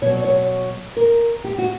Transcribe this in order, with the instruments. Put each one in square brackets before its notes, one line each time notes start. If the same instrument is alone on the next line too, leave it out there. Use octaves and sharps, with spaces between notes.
[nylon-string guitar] B2 F#3 C#5
D5
C#5
A#4
G4
F#4